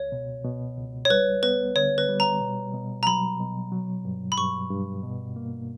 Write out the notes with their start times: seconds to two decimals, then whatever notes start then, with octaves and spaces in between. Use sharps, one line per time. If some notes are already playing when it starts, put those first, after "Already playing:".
Already playing: C#2 C#5
0.12 B2
0.45 B2
0.78 C#2
1.05 C#5
1.10 G3 B4
1.43 B3 B4
1.76 D3 C#5
1.98 B4
2.09 G3
2.20 A#5
2.41 B2
2.74 B2
3.03 A#5
3.07 F#3 B5
3.40 B2
3.72 F#3
4.05 G2
4.32 B5
4.38 G2 C#6
4.71 G2
5.03 B2
5.36 A#3